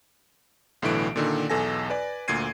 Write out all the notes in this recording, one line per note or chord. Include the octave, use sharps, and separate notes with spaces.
B1 A2 D3 E3 D7
A#2 D3 D#3
B1 E2 A4 G#5 A#6
B4 D5 G#5
D2 A#2 G#6 C7 D#7